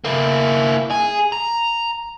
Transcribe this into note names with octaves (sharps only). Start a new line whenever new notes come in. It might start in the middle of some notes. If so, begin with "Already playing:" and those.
A#3 E4
G#4
A#5